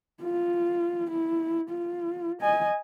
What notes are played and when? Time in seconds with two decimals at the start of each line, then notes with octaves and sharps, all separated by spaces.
0.22 F4
1.10 E4
1.70 F4
2.41 D#5 G#5